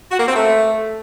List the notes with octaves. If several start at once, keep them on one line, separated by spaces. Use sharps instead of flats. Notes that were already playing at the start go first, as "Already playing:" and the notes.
F#4
A#3
C4
A3